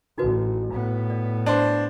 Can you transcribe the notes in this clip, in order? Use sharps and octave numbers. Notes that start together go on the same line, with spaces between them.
A1 D#4 F#4 B4
A2 B3
D5
D4 C5